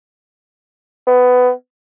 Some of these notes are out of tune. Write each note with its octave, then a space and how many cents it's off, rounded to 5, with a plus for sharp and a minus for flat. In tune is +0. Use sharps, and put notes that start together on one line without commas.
B3 +15